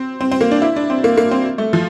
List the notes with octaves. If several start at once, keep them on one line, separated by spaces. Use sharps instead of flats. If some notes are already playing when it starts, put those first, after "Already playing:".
Already playing: C4
C4
C4
A#3
D4
E4
D4
C4
A#3
A#3
C4
A3
F3